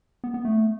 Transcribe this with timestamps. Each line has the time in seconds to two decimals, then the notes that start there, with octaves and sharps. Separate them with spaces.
0.24 B3
0.34 B3
0.45 A3